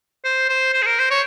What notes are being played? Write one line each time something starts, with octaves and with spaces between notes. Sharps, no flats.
C5
C5
C5
G#4
A#4
C5
C#5